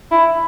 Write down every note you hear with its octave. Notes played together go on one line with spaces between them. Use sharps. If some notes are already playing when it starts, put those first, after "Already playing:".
E4